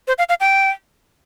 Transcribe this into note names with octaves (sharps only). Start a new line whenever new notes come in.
C5
F5
F5
G5